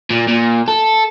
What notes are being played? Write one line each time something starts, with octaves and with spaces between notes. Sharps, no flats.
A#2
A#2
A4